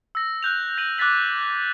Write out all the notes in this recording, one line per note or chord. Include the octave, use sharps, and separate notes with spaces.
E6 A#6
F#6 G6 F7
A#6 D#7 F7 F#7
D6 F#6 G#6 A6 B6 F#7